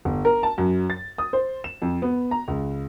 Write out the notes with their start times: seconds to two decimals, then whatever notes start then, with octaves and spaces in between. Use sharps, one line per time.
0.05 G1
0.25 A#4
0.43 A5
0.58 F#2
0.90 A6
1.18 D#6
1.33 C5
1.64 E7
1.82 F2
2.02 B3
2.31 A#5
2.48 C#2